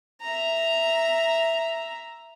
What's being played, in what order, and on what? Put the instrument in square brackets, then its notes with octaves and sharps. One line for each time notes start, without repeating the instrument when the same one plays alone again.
[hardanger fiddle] E5 A#5